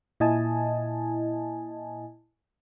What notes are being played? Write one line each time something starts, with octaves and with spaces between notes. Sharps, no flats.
A#2 E4 D#5 G#5 A5